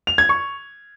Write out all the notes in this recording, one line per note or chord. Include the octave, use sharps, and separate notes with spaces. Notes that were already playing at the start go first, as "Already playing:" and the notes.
F7
G#6
C#6